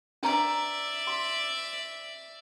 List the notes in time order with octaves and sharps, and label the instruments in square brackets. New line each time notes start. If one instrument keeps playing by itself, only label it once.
[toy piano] D4 B4 A#5 [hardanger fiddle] D5 E5
[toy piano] C6